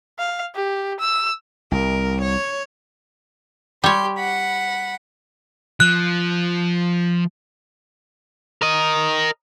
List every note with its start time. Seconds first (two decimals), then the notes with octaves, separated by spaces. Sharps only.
0.19 F5
0.55 G4
1.00 E6
1.72 C2 A#4
2.21 C#5
3.84 G3 G4 C#5 C6
4.18 F#5 B5
5.80 F3 F#6
8.62 A#4 D#5